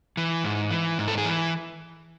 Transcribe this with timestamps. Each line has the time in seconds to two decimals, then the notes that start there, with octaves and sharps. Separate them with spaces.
0.17 E3
0.44 G#2
0.71 E3
0.98 G#2
1.08 A4
1.18 G#4
1.25 E3